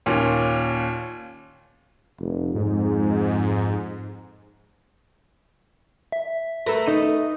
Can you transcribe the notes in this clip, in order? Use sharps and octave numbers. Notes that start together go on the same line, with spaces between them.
D#2 A#2 C#4
F1
F2 G#2
E5
A3 A#4 B4
D#4 D#7